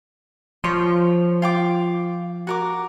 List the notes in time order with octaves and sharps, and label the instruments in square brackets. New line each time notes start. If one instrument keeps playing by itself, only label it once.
[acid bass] F3 [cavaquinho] C#5 C6
[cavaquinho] F4 G5 D6
F#4 A#4 D6